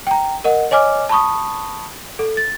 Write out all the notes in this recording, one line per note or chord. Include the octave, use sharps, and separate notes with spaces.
G5 A#5
A#4 D#5 F#5
C#5 D#5 G#5 D6 F6
A5 B5 C#6 D#6
A4
A6